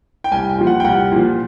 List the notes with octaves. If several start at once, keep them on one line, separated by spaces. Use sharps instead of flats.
G5
C2 G#5
G5
A#2 F3
F#5
G5
C2 F#5
A#2 F3